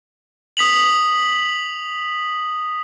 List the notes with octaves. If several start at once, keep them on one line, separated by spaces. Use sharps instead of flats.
D#6 B6 F7 F#7